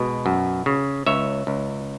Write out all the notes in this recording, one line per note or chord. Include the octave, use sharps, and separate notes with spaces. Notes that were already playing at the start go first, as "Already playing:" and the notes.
Already playing: B2 G#3
F#2
C#3
C#2 C#5 E5
C#2